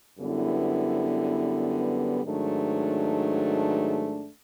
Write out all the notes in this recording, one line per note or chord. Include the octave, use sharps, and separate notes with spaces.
F#2 D3 G3 B3 E4
G#2 D#3 F#3 A3 D4